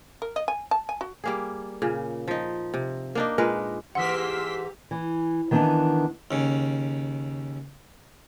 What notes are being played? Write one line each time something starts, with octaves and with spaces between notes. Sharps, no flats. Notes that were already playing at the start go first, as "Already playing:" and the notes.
A#4
D#5
G#5
A5
G#5
F#4
G3 A#3 G#4
A#2 C#3
F3 D#4
C3
A#3 D4 D#4
A#2 G#3 A#4 B4
G#2 E3 A#3 G4 F#5 C6 E6 B6
E3
D#3 E3 B3 C4 D4 D#4
D#2 C#3